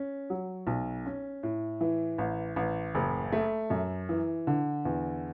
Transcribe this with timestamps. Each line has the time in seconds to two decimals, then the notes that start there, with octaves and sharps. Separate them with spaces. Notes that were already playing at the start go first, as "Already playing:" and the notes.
Already playing: C#4
0.30 F#3
0.67 B1
1.06 C#4
1.43 A2
1.81 E3
2.18 A1
2.56 A1
2.95 F#1
3.32 A3
3.70 F#2
4.09 E3
4.47 D3
4.85 E2